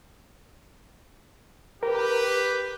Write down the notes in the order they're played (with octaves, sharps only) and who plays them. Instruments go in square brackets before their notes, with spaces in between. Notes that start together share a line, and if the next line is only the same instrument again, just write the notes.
[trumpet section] G4 B4 [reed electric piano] A#4